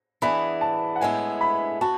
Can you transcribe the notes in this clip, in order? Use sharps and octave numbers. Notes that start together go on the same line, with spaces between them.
E3 B3 D4 G#4 B5
A5
F#5
A2 G#3 B3 E4 G#5
B5
B3 F#4 A5